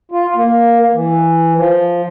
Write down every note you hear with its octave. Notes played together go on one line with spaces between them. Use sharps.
F4
A#3
E3
F3